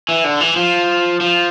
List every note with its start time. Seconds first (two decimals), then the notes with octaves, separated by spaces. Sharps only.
0.09 E3
0.24 D3
0.41 E3
0.56 F3
1.21 F3